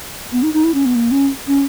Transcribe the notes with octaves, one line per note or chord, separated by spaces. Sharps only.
B3
D#4
D#4
E4
C#4
B3
A#3
C#4
C#4